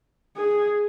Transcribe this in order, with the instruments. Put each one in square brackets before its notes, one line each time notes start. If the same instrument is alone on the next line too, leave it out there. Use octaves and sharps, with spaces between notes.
[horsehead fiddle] G#4